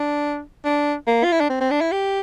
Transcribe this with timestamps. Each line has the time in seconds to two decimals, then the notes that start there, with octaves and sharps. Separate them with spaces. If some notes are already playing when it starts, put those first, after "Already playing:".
Already playing: D4
0.65 D4
1.07 A#3
1.24 F4
1.32 E4
1.41 D4
1.50 C4
1.61 C4
1.71 D4
1.81 E4
1.92 G4